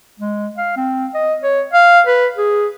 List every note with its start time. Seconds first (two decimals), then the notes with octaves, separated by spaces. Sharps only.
0.19 G#3
0.57 F5
0.76 C4
1.14 D#5
1.43 C#5
1.73 F5
2.07 B4
2.37 G#4